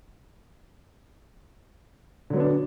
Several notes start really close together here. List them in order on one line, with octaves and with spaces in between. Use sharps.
D3 F#3 B3 D4